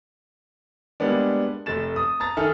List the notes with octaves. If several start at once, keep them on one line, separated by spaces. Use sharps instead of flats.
G3 G#3 A#3 B3 D4
F1 A3 A6 E7
D#6
A5 A#5 A6
D#3 A4 E5 G#5 F6